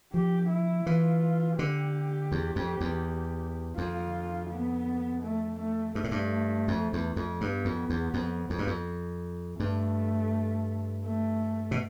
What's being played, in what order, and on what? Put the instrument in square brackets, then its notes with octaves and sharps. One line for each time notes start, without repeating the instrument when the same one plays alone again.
[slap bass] F3 [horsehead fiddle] G4
[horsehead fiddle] E4
[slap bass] E3 [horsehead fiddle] F4
[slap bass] D3 [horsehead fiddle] G4
[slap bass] E2
F2
E2
[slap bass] F2 [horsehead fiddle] F4
[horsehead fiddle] B3
A3
A3
[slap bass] G2 [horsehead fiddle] A3
[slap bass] A2
G2
F2
E2
F2
[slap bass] G2 [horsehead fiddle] B3
[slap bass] F2
E2
F2
F2
G2
F2
[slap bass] G2 [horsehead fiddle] A3
[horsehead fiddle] A3
[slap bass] B2